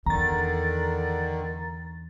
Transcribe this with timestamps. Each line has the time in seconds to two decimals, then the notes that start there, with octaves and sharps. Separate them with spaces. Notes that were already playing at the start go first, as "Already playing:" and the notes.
0.06 E2 D3 D#3 A#5 A6